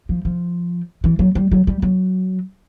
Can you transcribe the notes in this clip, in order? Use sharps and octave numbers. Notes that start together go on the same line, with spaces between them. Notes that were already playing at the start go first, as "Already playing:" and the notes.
F3
F3
E3
F#3
G3
F#3
G3
F#3